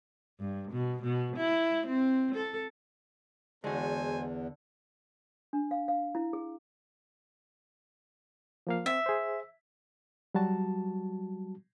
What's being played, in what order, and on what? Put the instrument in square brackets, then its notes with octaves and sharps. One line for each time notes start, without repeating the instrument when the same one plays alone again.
[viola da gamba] G2
B2
B2
E4
C4
A4
[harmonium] E2 [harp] D3 [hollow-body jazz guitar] G#3 F#4 [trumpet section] A4 C5 G#5
[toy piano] D4
F5
F5
E4
G#4
[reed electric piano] F3 A#3 F5
[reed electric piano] C4 [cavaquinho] E5
[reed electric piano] G#4 C5
F#3 G3 F#4 A5